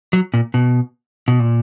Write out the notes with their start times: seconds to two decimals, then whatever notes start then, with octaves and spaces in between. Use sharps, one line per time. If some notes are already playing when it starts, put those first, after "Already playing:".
0.13 F#3
0.34 A#2
0.54 B2
1.28 B2
1.39 A#2